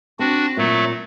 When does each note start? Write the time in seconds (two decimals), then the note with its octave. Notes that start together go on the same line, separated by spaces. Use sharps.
0.19 C4 D4 F#4
0.57 A#2 F#3 A3